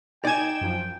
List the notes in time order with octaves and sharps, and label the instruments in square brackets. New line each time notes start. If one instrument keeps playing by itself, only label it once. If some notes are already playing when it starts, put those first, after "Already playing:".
[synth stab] D#4 G#6 E7 [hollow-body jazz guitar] D5 G#5 [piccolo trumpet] G5
[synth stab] F#2 F3